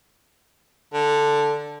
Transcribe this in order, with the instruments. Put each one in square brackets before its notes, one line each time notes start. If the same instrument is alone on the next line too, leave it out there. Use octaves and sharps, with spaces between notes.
[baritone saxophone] D3